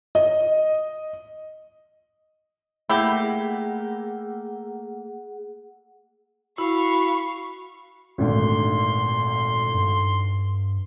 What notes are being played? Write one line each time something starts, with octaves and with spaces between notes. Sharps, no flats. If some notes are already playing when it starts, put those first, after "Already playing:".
D#5
A3 A#3 E4 G4 G#4 F#5
E4 F#4 F5 B5 C#6
G#1 D2 A#2 C6
G2